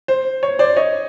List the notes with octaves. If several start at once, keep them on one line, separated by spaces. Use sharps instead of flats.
C5
C#5
C5 D5
C#5 D#5